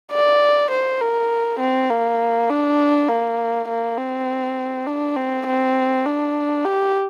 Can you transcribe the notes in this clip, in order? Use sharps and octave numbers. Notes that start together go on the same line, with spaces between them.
D5
C5
A#4
C4
A#3
D4
A#3
A#3
C4
D4
C4
C4
D4
G4